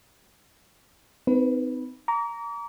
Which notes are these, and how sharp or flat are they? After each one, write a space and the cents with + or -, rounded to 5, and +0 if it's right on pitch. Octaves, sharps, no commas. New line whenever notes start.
C4 -40 D#4 +0 B4 -10
A#5 +0 D6 -40